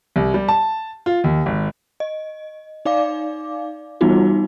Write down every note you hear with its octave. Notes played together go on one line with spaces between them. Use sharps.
C2
G3
A5
F4
D#2
G#1
D#5
D#4 D5 F5 D6
E3 G3 B3 D#4 F4 F#4